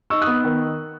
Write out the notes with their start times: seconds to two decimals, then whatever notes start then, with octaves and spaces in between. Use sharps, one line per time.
0.10 D#4 C#6 E6
0.21 D#6 F#6
0.27 B3
0.44 D#3